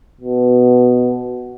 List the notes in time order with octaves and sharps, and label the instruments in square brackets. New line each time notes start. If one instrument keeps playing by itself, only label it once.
[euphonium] B2